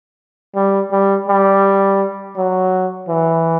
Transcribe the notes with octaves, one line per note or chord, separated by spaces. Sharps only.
G3
G3
G3
F#3
E3